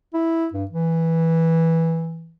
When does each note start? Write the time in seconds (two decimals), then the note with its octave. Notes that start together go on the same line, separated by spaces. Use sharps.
0.14 E4
0.54 G2
0.71 E3